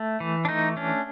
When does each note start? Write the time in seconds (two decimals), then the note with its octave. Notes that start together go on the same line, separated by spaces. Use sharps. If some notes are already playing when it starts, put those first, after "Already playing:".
Already playing: A3
0.20 E3
0.45 D4
0.49 A3 D#4
0.77 C#4 D4